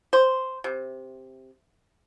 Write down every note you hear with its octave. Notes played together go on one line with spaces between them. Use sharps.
C5
C3